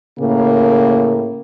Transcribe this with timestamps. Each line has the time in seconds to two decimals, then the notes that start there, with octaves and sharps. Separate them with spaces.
0.19 A2 C#3 A#3